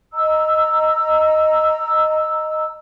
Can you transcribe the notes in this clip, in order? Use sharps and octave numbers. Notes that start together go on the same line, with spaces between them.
D#5 A#5 E6